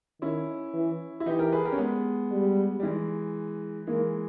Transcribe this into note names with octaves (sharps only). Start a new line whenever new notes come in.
D#3 C#4 E4
E3
E4
E3 D#4 G4
G4 A#4
G#4 B4
G4 A#4
C#4
G#3 B3
G3
G3
E3 G#3
E3 G#3 A#3